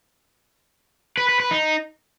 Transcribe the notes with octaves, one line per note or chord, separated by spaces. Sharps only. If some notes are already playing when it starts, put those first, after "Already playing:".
B4
B4
B4
D#4